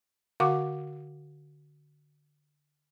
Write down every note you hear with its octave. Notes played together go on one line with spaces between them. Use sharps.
D3 F#4 F5 F#5 C#6 D6